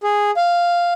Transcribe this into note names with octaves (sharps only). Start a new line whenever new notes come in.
G#4
F5